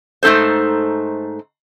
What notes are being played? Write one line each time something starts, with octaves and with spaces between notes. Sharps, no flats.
G#2 A3 D#4 A4 C5